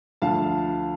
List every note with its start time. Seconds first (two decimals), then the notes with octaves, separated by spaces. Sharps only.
0.22 D2 D3 F3 F5 A5